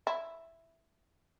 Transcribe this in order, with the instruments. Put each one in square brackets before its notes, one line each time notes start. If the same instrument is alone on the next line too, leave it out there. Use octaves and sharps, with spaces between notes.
[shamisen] E4